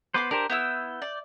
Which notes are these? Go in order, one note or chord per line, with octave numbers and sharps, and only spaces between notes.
B3 B4 C5 C6 D6 D#6
D4 G4 A#4 C5
B3 E4 E6 G6
D5